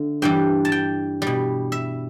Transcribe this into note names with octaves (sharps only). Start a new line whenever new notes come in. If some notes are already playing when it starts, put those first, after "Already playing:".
Already playing: D3 A3
G2 E3 G3 G5
A5
G5
B2 G3
E5